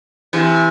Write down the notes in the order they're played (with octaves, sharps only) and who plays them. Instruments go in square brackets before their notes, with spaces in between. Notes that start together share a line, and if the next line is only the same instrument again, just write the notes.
[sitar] C3 E3